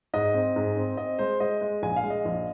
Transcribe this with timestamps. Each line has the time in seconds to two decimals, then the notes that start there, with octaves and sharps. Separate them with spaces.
0.13 G#2 D#5
0.34 C4
0.56 G#2
0.76 C4
0.97 C4 D#5
1.19 G#3 C5
1.40 G#3 D#5
1.61 G#3
1.82 A#1 G#5
1.96 F5
2.04 G#3
2.10 D#5
2.25 A#1